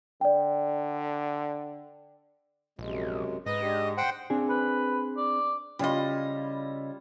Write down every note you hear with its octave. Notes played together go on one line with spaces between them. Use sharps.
D3 D5 G5
A#1 F#2 C3 G#3
G#2 B4 D#5
G#3 D4 G4
C5 F#5 G5
C4 D4 G#4
B4
D5
C#3 G3 E4 F4 D#5